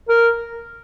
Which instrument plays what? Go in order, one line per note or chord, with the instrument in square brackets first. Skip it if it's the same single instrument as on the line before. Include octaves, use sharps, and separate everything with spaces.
[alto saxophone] A#4